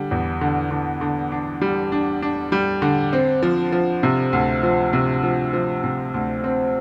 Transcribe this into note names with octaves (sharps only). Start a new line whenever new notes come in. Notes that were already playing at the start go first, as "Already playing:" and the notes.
Already playing: D3 G3
E2
D3
D3
D3
D4
G3
D4
D4
G3
D3
C4
F3
F3
C3
D2
F3
C3
F3
F3
C3
D2
C4